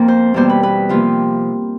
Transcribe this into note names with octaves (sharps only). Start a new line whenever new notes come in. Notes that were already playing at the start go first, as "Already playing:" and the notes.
Already playing: F2 F3 A#3
C5
E2 B2 G3 A#3 C5
B4
B4
C3 F3 A#3 F4